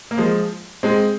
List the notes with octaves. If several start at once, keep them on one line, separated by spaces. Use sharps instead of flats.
A#3
F3 G#3
G#3 C4